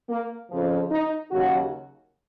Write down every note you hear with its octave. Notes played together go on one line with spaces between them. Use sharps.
A#3
F2 C#3 F3
D#4
D#2 C#3 F#3 F#4